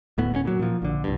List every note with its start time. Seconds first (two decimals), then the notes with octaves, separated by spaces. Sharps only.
0.18 D1 A2 B3
0.32 D1 G2 C#4
0.45 A#2 F#3
0.59 A#2 F3
0.82 A#1 D3
1.04 C2 G2